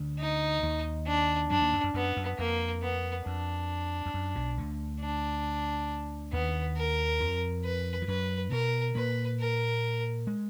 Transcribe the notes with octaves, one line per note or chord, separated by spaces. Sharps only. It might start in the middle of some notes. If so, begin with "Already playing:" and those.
Already playing: D2 D3
D#4
D#2 D#3
D4
F#2 F#3 D4
D#2 D#3
F#2
F#2
F#2 B3
F#2
F2 A#3
B3
F2 D4
F2
F#2
B1 B2
D2 D3
D4
D#2 D#3 B3
A#4
F2 F3
B4
F3
F#2 F#3 B4
B2 B3 A#4
A#2 A#3 B4
A#4
G#3